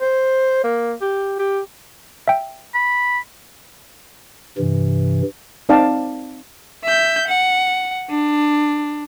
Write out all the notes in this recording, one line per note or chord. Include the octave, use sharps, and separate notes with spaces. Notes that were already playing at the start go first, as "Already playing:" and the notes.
C5
A#3
G4
G4
E5 G5
B5
G2 C3 E3
C4 D#4 D5 F5 G5 A5
E5 G6
F#5
D4